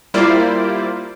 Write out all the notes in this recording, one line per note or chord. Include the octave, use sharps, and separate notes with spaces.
G3 A#3 E4 F4 C5 D5